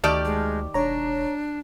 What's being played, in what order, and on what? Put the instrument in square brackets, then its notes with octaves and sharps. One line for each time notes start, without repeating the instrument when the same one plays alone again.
[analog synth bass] D2 [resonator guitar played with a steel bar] D#3 G4 D5 [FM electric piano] A5 F6 G6
[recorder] G#3
[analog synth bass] E1 [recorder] D4 [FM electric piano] C#5 A#5